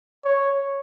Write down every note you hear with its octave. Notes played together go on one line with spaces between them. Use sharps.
C#5